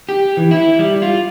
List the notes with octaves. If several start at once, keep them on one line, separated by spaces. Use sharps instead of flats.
G4
E3
E4
G3
F4